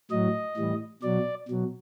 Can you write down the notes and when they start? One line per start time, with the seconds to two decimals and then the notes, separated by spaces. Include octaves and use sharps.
0.11 A2 F#3 D#5
0.57 A2 E3 G3
1.03 B2 F#3 D5
1.48 B2 F#3